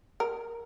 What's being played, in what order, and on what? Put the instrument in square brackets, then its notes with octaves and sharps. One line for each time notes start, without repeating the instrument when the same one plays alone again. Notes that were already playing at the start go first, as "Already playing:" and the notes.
[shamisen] A#4